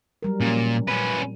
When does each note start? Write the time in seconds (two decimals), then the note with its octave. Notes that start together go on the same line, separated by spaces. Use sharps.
0.23 F#3 G3 A#4
0.41 A#2 F3 C#4
0.88 A#2 C#4 B4